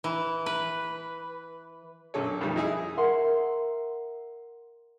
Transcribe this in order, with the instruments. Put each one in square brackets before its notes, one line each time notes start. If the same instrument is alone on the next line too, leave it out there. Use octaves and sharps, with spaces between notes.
[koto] E3
B4
[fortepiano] F#2 A#2 D3 A4 C#5
B1 F2 D#3 G3 A3
D#4 E4 G#4
[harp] A#4 E5 F#5 C6